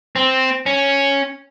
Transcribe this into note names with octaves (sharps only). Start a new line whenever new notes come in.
C4
C#4